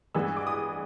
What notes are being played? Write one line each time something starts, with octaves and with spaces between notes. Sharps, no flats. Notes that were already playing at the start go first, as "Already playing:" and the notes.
G2 E3 G#3 B3 E6
D6
D#6